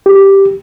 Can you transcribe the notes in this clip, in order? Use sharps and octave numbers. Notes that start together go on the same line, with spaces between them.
G4